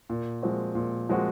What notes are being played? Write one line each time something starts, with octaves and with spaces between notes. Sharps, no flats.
A#2
F3 G#3 C4 F#4
A#2
F3 G#3 C4 F#4